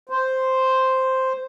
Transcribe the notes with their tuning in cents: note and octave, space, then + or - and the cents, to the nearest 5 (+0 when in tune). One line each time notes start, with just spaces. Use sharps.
C5 +0